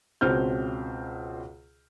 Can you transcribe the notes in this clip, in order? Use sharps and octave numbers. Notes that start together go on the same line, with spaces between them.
C#2 B2 C4 F6 G6